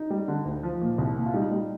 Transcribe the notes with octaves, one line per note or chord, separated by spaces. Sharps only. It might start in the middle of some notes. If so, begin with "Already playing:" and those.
Already playing: D#4
G3
D3
D2
F3
A#2
C2
A#2
F4
G3 D#4
G3